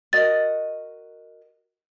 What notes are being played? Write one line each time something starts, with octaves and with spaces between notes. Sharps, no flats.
F#4 A#4 D#5 A6